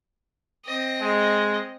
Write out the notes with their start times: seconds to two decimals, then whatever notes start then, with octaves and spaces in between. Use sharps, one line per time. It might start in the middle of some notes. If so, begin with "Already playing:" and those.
0.65 C4 D#5
1.02 G#3